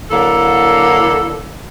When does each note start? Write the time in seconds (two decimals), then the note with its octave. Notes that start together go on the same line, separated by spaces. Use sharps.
0.11 D3 F#3 A#3 E4 A4